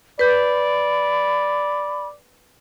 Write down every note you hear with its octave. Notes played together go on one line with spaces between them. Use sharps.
B4 D5 B5 G6